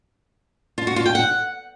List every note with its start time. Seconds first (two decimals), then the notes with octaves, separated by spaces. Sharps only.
0.78 F4
0.87 F#4
0.96 F4
1.06 G5
1.15 F#5